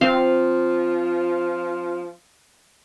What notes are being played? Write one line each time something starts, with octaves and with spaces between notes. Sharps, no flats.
F3 C4 F4 F5